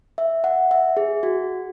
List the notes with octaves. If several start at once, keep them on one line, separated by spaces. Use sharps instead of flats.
E5
F#5
E5
G#4
F#4